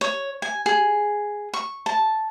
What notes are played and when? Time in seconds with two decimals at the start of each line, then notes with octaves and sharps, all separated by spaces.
0.01 C#5
0.42 G#5
0.66 G#4
1.54 C#6
1.86 A5